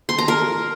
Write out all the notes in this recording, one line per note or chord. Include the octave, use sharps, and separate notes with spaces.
C6
A#5
A#4